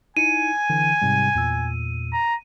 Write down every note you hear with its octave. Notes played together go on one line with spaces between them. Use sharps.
D#4 E4 G#5 C#7 D#7
D3 E3
G#2 C3 G3
E2 A#2 E6
A#5